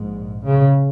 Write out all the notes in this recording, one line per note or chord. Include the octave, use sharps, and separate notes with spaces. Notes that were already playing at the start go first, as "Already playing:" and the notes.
Already playing: A#1 G#2
C#3